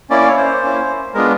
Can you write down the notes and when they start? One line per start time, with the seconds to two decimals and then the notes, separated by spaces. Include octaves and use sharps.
0.10 A#3 C#4 E4 D5
0.28 C#5
0.37 C5
0.62 A#3 C#4 E4
1.14 G#3 B3 D4 F4 A#4